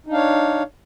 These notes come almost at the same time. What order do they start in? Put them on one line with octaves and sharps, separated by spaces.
D#4 D4 F5 C#5